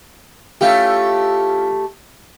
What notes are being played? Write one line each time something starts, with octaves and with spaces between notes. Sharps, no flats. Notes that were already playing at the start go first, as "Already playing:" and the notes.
A3 C#4 E4 F4 G4